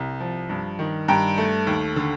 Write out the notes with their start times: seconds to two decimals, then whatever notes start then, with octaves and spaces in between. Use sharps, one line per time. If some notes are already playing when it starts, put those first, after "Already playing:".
Already playing: C2 C3
0.20 F3
0.49 G2
0.79 D#3
1.08 G2 G5 A#5
1.38 A3
1.67 D#2
1.96 D3